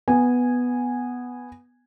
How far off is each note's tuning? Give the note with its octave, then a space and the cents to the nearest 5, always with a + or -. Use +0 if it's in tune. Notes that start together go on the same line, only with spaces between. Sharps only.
B3 +0 G#5 -10